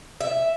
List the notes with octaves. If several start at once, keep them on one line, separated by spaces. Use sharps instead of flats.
E5